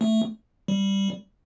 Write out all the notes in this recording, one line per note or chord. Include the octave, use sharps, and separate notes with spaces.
A3
G3